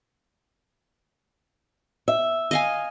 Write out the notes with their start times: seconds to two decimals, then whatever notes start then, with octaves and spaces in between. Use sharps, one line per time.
2.08 E5
2.51 D#5 F5 G#5